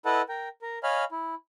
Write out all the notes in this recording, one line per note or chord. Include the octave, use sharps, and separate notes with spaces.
E4 A4 B4 D#5 F#5 A5
A#4 G5
A#4
C#5 D#5 F5 G#5 B5 F6
E4